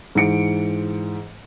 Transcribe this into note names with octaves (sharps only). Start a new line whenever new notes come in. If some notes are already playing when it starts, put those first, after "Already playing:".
G#2 E3 C#7 D7